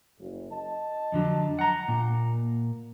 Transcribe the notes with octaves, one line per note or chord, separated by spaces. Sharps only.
F#1
D#5 A5
F2 D3 F#3
F#5 A#5
A#2 A#3